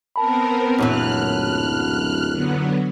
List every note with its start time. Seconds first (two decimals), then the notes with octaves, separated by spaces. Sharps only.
0.16 B3 C4 A#4 A5 B5
0.78 D1 F#2 A#2 E3 F6 F#6
2.32 D3 F#3 B3